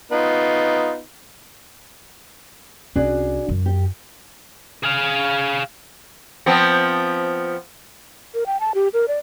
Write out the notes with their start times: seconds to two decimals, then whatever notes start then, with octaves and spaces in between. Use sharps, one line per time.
0.12 B3 D#4 F4
2.96 C2 C#4 D4 F#4 G#4
3.49 F#2
3.66 G4
4.83 G#4 F5
6.46 F3 B3 C4
8.34 A#4
8.46 G5
8.60 A5
8.75 G4
8.93 A#4
9.08 D5